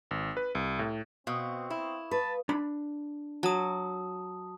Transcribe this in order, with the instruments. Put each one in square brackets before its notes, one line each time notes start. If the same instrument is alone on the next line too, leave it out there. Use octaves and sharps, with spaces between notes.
[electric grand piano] G#1
B4
C2
A2
[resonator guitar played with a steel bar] B2 [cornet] C4 [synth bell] F5 C#6 D#6
[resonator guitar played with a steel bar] E4
[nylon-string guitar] B4 [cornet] A5
[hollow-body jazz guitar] D4 B5
[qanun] F#3 [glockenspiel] A5 D#6